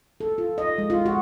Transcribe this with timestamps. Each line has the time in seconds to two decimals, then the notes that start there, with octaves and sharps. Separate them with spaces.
0.20 A4
0.38 F4
0.58 D#5
0.78 G#3
0.90 F4
1.06 F#4